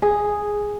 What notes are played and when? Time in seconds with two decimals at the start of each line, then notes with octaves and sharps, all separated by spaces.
0.02 G#4